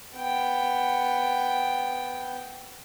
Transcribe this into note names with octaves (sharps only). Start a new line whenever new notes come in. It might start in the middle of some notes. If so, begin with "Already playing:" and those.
B3 G5